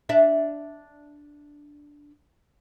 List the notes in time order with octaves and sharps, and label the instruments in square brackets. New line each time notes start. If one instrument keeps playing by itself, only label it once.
[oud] D4 D5 E5